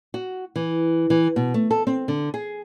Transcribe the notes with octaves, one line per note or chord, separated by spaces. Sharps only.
F#4
E3
E3
B2
A3
A4
C4
D3
G#4